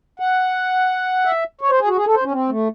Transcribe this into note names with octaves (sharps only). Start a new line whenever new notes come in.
F#5
E5
C#5
C5
G#4
F#4
G#4
A4
C5
C#4
C4
A3